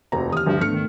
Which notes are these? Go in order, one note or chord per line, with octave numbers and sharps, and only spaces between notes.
F1 D#2 F#4 C5 A#5
D#3 E3 G4 D#6 F6
D2 G2 F3
G#2 A3 B3 D4 F6 C#7
D#3